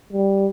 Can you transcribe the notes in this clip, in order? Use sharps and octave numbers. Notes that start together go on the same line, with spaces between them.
G3